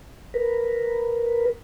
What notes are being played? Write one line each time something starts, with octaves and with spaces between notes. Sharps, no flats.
A#4 B4